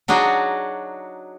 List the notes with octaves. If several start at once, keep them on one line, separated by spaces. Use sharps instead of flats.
F#3 D4 D#4 F#4 G#4